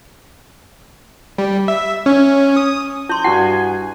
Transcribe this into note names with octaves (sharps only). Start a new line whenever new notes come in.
G3
E5
C#4
D#6
E4 C6 G6
G2 E4 F#4 F#5 G#5 C7